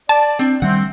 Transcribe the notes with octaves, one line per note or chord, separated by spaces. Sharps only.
D5 A5
C4 D4
D#3 G3 A3 C4 F#5